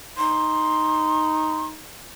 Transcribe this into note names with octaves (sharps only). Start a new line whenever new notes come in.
D#4 C6